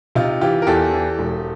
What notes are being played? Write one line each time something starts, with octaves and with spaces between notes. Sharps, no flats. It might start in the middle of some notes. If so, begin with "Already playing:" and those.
C3 D#4 F4
E3 F4 G4
A#4
E2 G4 A4
E3
E1